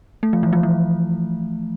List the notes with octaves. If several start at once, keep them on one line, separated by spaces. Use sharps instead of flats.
A3
F3
E3
F3
E3